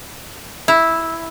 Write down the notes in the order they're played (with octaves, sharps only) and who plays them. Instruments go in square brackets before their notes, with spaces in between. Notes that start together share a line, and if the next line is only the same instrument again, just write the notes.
[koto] E4